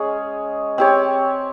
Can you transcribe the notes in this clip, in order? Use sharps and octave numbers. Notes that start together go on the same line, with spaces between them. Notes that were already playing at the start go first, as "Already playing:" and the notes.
Already playing: G#3 C#4 G#4 C#5
C4 G4 C#5